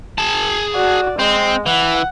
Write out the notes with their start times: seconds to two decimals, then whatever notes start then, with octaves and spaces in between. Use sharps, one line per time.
0.18 G#4 A5
0.75 F#4 D5
1.19 G#3 C4
1.66 E3 F#5